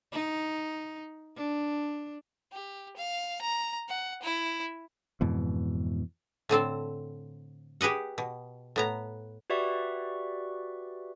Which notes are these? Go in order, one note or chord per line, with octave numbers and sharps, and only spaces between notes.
D#4
D4
G4
F5
A#5
F#5
E4
F2 G#2 B2 E3
A2 D3 C4 A4
G4 G#4 B4 D#5 F#5
B2
A2 B3 A#5
F#4 G4 B4 D5 E5 C#6